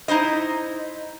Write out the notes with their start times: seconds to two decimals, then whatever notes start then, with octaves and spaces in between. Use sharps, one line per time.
0.08 D#4 E4 C5 D#5